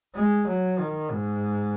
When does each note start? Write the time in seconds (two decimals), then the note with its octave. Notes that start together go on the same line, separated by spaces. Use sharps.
0.15 G#3
0.47 F#3
0.79 D#3
1.11 G#2